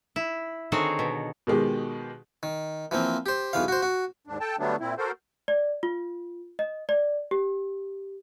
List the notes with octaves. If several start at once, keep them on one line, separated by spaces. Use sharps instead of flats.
E4
D3 D#3 C4 F#4 G#4 C#5
B2
B2 D#3 G#3 G4
D#3
E3 F3 A#3 C4
G4 C5
B1 E2 E3 F5
F#4 C5
F#4
D#2 G#2 D4
A4 G5 A5
D3 F#3 G3 A3 B3 D4
A#2 C4 E4
F#4 A4 A#4 C5
D5
F4
D#5
D5
G4